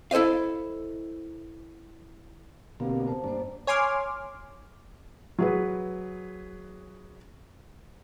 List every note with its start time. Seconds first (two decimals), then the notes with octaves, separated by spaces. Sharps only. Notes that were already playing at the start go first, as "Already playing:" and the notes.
0.11 E4 A4 C5 D#5 F5
2.80 B2 D3 A#3 C4 G4 F5
3.07 C5 A5
3.24 G2 A#3 D4 C5
3.67 C#5 G#5 C6 D6 F6
5.39 F#3 G#4 B4